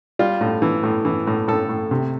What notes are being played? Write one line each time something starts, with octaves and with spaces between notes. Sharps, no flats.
G3 F4
A2
E3
A2
E3
A2
A2 A4
A2
C3